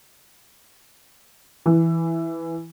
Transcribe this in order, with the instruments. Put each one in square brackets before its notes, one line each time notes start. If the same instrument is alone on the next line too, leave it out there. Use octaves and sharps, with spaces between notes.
[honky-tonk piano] E3